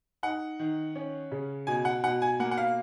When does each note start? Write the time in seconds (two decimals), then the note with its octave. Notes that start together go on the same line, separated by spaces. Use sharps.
0.23 D#4 F#5
0.59 D#3
0.96 C#4
1.32 C#3
1.67 B2 G#5
1.85 F#5
2.04 B2 F#5
2.22 G#5
2.40 A#3 F#5
2.51 F#5
2.58 F5